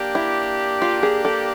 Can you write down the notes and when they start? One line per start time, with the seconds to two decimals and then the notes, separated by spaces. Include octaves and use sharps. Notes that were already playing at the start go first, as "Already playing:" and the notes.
Already playing: A#3 D4 G4
0.15 E4
0.82 F4
1.03 G#4
1.25 A4